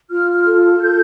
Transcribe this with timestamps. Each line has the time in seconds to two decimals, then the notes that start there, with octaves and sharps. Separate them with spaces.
0.10 F4 F6
0.34 F6
0.45 A4
0.80 F4 G6